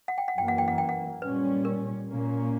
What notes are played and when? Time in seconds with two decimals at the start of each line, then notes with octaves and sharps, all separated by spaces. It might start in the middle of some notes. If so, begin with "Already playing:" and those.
0.08 F#5
0.18 G5
0.28 F#5
0.36 F#2 E3 A#3 G5
0.48 F#5
0.58 G5
0.68 F#5
0.78 G5
0.89 F#5
1.22 A#2 G3 C#4 B4
1.65 A#4
2.08 A#2 A#3 C#4